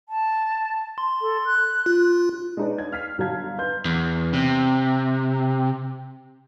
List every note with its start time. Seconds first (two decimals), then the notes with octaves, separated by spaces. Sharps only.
0.09 A5
0.98 C6
1.22 A4
1.46 F#6
1.86 F4
2.57 G#3 D4 D#4 B4 C#5 D5
2.78 G#6
2.92 F6 B6 C7
3.18 G1 F#3 F5 A5 G#6
3.58 B4 C6 G6
3.85 E2
4.33 C3